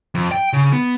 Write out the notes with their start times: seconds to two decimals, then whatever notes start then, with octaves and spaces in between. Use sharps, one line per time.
0.15 F2
0.32 G5
0.53 C#3
0.73 B3